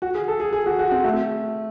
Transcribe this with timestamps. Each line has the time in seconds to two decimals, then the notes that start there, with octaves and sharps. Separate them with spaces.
0.02 F#4
0.15 G#4
0.28 A4
0.40 G#4
0.53 G#4
0.66 F#4
0.79 F#4
0.91 C4
1.04 A3